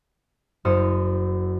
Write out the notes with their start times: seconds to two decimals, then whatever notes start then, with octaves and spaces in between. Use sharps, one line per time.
0.65 F#1 F#2 C5 D#6 F6 C#7